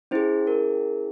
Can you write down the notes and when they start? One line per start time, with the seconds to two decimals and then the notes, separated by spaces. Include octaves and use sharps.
0.11 C#4 E4 G#4 C5
0.47 A#4